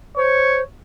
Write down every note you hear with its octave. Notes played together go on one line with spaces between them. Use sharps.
C5 C#5